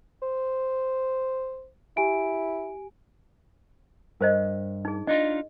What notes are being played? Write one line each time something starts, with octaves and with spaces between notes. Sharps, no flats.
C5
E4 G4 G#5 D7
G2 A#4 C5 D#5
D#4 G#4
D4 D#4 F4 D#5